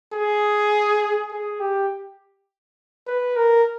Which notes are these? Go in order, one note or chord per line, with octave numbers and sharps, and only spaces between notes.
G#4
G#4
G4
B4
A#4